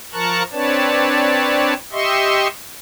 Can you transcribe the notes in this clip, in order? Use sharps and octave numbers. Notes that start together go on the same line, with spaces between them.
F3 A#4 A5 A#5 C#6 F#6
C4 D4 B4 C#5 D5 A5
G4 D#5 E5 C6 C#6